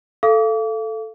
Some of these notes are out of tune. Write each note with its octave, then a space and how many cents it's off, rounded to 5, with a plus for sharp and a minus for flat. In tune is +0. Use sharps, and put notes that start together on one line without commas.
A4 +0 F5 -30 D6 -35